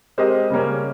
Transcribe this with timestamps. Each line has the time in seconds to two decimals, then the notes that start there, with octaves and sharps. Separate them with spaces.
0.18 G#3 C4 G4 A#4 D#5
0.50 C#3 G3 A#3 C#4